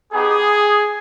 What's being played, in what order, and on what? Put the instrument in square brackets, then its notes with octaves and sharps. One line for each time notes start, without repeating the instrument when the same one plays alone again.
[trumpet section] B3 D#4 G4 G#4